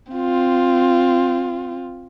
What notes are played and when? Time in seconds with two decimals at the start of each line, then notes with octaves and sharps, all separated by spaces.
0.13 C4 F4